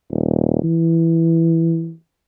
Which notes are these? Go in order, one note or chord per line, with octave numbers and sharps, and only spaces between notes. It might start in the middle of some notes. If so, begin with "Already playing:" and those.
D#1
E3